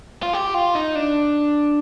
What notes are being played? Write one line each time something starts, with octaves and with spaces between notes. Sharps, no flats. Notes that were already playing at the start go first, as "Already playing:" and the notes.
F4
G4
F4
D#4
D4